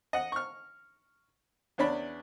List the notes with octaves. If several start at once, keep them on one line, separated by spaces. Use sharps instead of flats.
D#5 F#5
C#6 F6
E2 C#4 D4 B5